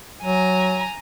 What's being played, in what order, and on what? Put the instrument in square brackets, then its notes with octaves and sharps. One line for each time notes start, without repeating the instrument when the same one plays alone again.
[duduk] F#3 [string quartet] G#5 A#5